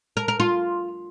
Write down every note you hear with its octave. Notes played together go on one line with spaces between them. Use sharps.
A#4
A#4
F4